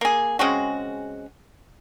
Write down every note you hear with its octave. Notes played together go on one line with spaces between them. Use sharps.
A#3 G#4
C#3 G#3 C4 F#4